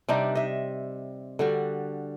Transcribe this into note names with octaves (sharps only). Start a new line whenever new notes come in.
C3 G3 D4 D#4
D#5 E5
D3 G3 F#4